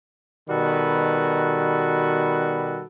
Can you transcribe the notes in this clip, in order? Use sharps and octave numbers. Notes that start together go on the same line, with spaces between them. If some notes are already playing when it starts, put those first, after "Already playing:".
B2 D#3 G3 F#4 A4 B4